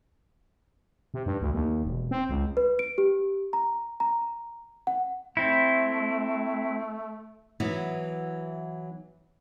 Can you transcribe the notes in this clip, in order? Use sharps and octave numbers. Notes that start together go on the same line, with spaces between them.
C3
G2
D2
D#2
E1
C4
C#2
B4
D7
G4
A#5
A#5
F#5
A3 C4 E4
E3 F#3 B3 E4